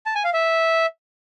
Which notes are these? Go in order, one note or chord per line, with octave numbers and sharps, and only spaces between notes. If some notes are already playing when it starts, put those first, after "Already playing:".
A5
G#5
F5
E5